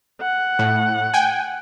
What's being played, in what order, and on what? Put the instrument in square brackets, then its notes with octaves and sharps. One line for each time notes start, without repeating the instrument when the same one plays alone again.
[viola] F#5
[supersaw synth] A2
G5 G#5